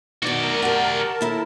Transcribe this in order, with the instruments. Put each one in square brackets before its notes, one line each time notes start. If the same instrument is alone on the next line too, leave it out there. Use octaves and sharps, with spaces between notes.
[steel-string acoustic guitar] B2 D#3 [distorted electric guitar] F#4 D5
[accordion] A#4
[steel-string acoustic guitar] G4 F#5 [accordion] A#4 A5
[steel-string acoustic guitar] D#2 E4 A4